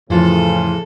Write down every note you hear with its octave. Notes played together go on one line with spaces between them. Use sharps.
F2 A2 C#3 E3 F3 F4 A4